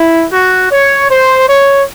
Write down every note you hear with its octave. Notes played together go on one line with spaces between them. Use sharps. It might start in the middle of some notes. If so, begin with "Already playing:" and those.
Already playing: E4
F#4
C#5
C5
C#5